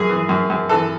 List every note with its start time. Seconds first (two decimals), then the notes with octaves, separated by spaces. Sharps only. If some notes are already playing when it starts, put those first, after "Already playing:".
Already playing: F#2 G#4
0.09 E3
0.29 F#2
0.50 F#2
0.69 E3 A4